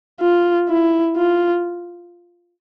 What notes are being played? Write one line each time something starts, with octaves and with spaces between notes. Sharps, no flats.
F4
E4
F4